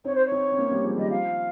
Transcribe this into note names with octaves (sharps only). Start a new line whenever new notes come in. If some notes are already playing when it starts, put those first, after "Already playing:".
C4 D#4 C#5
C5
C#5
C4 D#4
C4
A#3 C#4
G3 A#3
F3 G#3
D#3 G3 D#5
F3 F5